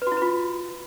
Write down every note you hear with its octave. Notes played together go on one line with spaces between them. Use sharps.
B4
F#4
E4
B4
F4